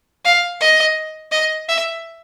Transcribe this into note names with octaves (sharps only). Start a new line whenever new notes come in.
F5
D#5
D#5
E5